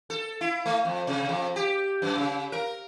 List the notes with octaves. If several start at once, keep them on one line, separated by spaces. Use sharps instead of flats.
A4
E4
A3
F2
C3
F2
G4
F#2
C#3
A#4